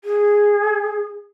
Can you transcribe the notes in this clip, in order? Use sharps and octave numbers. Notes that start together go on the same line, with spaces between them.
G#4